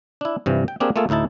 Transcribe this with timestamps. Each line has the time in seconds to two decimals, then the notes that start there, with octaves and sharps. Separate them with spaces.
0.21 D4 E4
0.46 G2 C3 E3 F3
0.68 G5
0.80 A#3 C4 D4 G4 G#4 A#4
0.96 A3 A#3 F4 G#4 A4
1.09 D2 A2 D#4 E4 A5